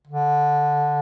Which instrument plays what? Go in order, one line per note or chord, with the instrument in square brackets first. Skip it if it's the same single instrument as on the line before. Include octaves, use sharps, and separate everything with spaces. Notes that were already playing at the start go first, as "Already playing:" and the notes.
[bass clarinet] D3